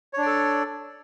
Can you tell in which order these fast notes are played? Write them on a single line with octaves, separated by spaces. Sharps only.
C#5 D4 D5 A4